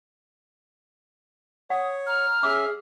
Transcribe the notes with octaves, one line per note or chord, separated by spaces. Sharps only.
C#5 F#5 D#6
A#5 F6
C#4 G#4 E5 D6